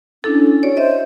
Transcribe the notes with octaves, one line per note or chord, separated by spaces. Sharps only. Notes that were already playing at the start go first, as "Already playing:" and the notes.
C#4 D4 E4 A4
F#4 C#5 D5
C5 D#5 E5